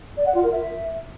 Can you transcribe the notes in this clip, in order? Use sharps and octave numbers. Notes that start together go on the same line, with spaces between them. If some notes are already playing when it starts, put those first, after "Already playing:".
D5
F#5
F4
A#4
E5